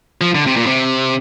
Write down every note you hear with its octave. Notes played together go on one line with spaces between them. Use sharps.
F3
D3
C3
A#2
C3